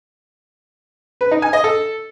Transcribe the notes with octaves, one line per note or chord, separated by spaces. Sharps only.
B4
D#4
G#5
D#5
A4